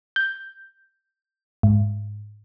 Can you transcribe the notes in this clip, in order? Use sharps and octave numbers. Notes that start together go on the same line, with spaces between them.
G6
G#2